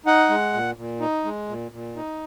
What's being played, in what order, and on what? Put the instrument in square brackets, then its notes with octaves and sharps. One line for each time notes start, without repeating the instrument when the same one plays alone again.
[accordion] D#4 F#5
G#3
A#2
A#2
D#4
G#3
A#2
A#2
D#4